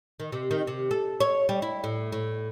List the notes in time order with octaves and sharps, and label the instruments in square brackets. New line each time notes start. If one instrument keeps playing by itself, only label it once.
[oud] D#3
C3
D#3
C3
A4
C#5
G3
E4
A2
A2